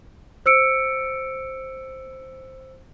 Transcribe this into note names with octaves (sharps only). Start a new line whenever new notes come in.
C5 E6 C#7 D7